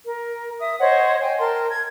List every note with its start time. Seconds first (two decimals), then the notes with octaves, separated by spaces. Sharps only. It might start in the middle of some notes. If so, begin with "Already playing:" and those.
0.05 A#4
0.59 E5 D#6
0.79 C5 C#5 D#5 F#5
1.21 G5 G#5
1.39 A#4 G5 A5 C6
1.69 G#6